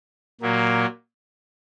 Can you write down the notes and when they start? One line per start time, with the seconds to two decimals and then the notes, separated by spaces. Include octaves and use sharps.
0.41 A#2 F#3 A#3